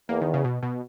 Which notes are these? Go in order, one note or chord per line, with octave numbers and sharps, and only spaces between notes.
E2 A#3
D#3
C#3
B2
B2